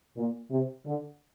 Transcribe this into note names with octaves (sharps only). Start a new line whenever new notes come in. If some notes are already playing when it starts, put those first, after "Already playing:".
A#2
C3
D3